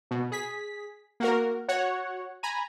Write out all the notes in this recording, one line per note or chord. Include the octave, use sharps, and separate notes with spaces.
B2
G#4 B6
A#3 F#4 A#4
F#4 C#5 F#5
G#5 A#5 B5